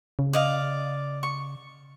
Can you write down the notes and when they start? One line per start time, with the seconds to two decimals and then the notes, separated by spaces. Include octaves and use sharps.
0.19 C#3
0.33 D5 D#5 F5
1.23 C#6